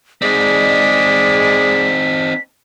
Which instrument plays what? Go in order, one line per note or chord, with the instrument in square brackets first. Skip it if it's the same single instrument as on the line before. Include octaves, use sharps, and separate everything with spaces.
[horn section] G#3 D5 [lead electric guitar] C4 D#4 [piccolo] B6